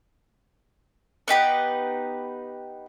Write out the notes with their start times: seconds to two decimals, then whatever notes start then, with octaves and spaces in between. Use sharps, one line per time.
1.28 B3 D#4 G4 B4